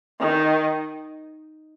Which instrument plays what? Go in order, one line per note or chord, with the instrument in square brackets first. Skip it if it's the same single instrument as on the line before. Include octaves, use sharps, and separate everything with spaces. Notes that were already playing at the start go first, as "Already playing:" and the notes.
[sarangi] D#3